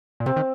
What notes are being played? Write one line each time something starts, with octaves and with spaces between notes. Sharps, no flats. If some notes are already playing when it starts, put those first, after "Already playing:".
A#2
C3 C4
D#3